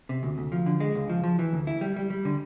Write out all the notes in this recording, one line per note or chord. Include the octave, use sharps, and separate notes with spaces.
C3
D2
D2
F3
D3
G#3
C#2
F3
F3
E3
D2
E4
G3
G3
G3
D3